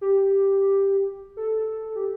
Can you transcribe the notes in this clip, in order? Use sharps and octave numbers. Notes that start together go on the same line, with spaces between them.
G4
A4
G4